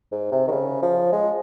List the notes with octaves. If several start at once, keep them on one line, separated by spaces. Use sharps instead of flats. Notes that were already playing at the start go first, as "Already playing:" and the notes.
G#2
C3
D#3
C#3
F3
G#3